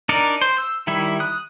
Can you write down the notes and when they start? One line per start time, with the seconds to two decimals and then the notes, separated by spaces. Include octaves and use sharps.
0.09 D4 D#4 A#4 D5
0.41 C5
0.58 E6
0.87 D#3 G3 E4 E5
1.20 D#6 F#6